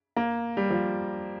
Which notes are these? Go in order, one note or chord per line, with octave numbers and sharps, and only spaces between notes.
A#3
G3
F3